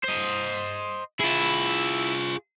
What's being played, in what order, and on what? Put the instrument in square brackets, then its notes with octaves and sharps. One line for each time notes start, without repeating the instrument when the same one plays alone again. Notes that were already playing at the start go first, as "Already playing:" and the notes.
[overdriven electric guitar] C5 D#5
[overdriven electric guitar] E4 [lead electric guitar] F4 G#4